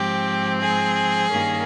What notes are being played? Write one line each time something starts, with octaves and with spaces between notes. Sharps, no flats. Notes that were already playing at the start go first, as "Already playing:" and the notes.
Already playing: G#2 F3 C4 G4
G#4
G2 D#3 A#3 C#4